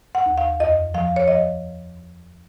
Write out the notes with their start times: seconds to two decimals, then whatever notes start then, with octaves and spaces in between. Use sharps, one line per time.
0.15 F#5
0.26 D#2
0.38 F5
0.60 F2 D#5
0.94 F3 F5
1.16 C#5
1.28 F3 D#5